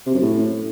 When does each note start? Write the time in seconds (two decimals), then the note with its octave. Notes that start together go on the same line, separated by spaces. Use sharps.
0.06 C3
0.14 F#2
0.22 A2